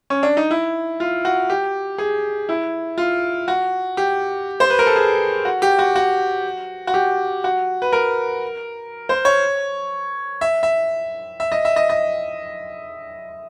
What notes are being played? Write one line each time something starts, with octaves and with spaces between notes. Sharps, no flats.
C#4
D4
D#4
E4
F4
F#4
G4
G#4
E4
F4
F#4
G4
C5
B4
A#4
A4
G#4
F#4
G4
F#4
F#4
F#4
G4
F#4
B4
A#4
C5
C#5
E5
E5
E5
D#5
E5
D#5
D#5